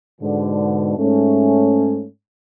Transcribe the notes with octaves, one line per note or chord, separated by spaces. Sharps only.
G#2 B2 D3
G#2 A3 C#4